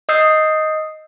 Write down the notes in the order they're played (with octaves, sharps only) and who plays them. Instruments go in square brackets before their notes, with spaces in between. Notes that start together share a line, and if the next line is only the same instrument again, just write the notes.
[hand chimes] D#5 D#6 E6 G6 C7